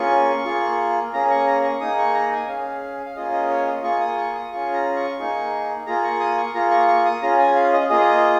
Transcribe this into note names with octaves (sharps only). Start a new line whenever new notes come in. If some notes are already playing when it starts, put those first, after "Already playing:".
Already playing: A#3 C#4 F4 G#4 C#6
A#3 F4 G#4
A#3 C#4 G#4 A#5
C#6
A#5
C#6
A#3 D#4 G#4 D#6
C#6
A#5
G#5
C#4 G#4 F5
F5
A#3 C#4 F4 G#4 D#5
D#5
C#5
D#5
A#3 F4 G#4 C#6
D#6
C#6
D#6
C#4 F4 G#4 C#6
A#5
C#6
A#3 D#4 G#4
A#3 F4 G#4 A#5
C#6
D#6
C#6
A#3 F4 G#4 A#5
C#6
C#6
D#6
C#4 F4 G#4 A#5
G#5
F5
D#5
A#3 F4 G#4 D#5